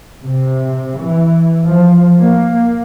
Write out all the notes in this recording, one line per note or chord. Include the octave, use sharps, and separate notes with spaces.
C3
E3
F3
A#3